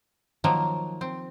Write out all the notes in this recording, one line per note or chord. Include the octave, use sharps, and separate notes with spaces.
D#3 F3 F#3 A#3
C4